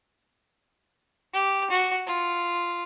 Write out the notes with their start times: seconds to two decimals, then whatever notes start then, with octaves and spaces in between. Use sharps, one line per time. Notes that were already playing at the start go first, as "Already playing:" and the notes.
1.33 G4
1.70 F#4
2.07 F4